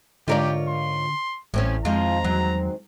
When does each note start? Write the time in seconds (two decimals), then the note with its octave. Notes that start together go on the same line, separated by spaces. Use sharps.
0.28 G#2 D3 F4 G4 A#4 C#5 D5
0.69 C6
1.54 A1 E2 A2 C4 C#4
1.85 F2 D#3 F3 G#3 C4 F4 A#5
2.24 E2 F#3